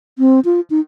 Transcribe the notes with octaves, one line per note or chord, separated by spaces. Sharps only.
C4
F4
D#4